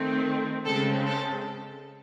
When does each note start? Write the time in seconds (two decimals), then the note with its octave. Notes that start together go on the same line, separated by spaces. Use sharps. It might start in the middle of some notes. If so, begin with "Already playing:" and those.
Already playing: D#3 A3 C4
0.65 C#3 G#3 C4 A4
1.06 A4